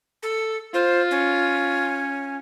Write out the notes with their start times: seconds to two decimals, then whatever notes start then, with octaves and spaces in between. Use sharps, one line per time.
0.23 A4
0.74 F4 C5
1.11 C#4